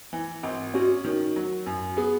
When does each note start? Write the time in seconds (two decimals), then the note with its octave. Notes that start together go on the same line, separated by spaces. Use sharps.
0.13 E3
0.43 G#1
0.74 C#4 F#4
1.05 D#3
1.36 F#3
1.66 F#2
1.97 B3 G#4